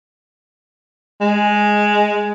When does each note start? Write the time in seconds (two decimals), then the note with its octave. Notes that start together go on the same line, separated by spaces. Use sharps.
1.21 G#3